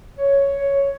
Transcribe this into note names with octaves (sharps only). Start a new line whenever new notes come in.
C#5